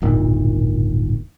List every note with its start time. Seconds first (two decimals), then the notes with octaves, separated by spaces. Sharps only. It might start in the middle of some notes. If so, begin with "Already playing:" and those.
0.02 D1 G1 A#2 D#3